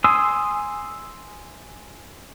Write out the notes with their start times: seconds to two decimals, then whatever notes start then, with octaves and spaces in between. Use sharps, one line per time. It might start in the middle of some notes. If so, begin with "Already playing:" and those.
0.04 G#5 C6 D#6 E6